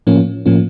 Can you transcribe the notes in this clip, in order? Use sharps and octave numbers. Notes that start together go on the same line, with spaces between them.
A2 F3 A#3 C#4
A2 F3 A#3 C#4